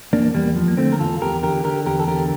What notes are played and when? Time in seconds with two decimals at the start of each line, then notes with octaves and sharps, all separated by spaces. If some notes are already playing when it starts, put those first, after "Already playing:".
0.13 E2 A#3 D4
0.34 E2 G3 A#3
0.56 F3
0.68 A#3
0.77 D3 A3 C4
0.92 A#4
0.99 E2 F4 A4
1.21 E2 G4 A#4
1.43 D3 G4 A#4
1.64 D3 G4 A#4
1.86 E2 G4 A#4
2.00 A4
2.08 D3 G4 A#4